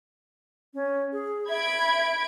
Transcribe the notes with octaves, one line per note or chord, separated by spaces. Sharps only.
C#4
G#4
E5 B5 G#6 D7